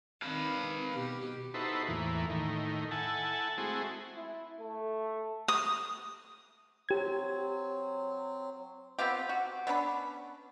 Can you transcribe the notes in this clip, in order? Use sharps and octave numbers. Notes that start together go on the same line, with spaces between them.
D#3 C4 B4 F5
B2 G4
D#4 E4 F#4 A4 B4 C5
E2 A2 E3 A#3
A2 D#3
E4 A4 F#5 G#5 A5
G#3 A3 C4 E4 F#4 G#4
E4
A3
D#6
F#3 C4 G4 G#6
B3 C4 F4 G4
F#4
B3 C#4 D4 B5